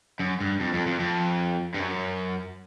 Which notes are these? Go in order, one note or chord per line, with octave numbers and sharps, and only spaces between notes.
F#2
G2
F2
F2
F2
F2
G2
F#2